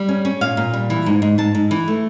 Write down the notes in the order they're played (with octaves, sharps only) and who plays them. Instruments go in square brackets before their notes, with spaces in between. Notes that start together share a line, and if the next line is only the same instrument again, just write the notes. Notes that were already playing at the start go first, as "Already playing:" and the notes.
Already playing: [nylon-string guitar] G3
C#4
C#4
A#2 F5
A#2
G3
E3
G#2
G#2
G#2 A5
G#2
E3
A3